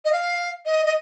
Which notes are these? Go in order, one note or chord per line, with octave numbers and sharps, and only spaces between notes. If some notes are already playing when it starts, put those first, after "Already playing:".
D#5
F5
D#5
D#5